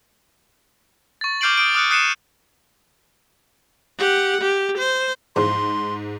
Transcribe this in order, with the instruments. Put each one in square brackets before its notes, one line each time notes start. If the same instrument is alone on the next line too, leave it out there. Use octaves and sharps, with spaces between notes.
[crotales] C#6 A6
D6 F6 G6 C7 D7 F#7
D#6 D7
D6 D#6 F6 F#6 C#7
D#6 F#6 C7 C#7 D#7 E7
[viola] G4 F#5
G4
C5
[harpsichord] E2 C#3 F3 [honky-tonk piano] G#2 [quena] C6